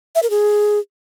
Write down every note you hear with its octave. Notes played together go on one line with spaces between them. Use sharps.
E5
A#4
G#4